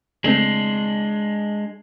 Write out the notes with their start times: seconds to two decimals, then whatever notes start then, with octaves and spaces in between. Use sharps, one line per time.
0.24 C#3 G#3 A3 C4 D4